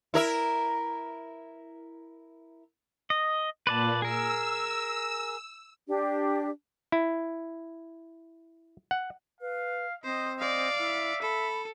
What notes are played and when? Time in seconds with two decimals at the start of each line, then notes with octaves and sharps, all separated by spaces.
0.14 E4 A#4 E5
3.10 D#5
3.67 A#2 B4 D5 A5
4.02 G#4 A#4 E6
5.88 D4 G4
6.92 E4
8.91 F#5
9.41 B4 F5
10.04 C4 C5 D#5
10.39 D5 D#5 F5
10.79 E4 E5
11.22 A4 B5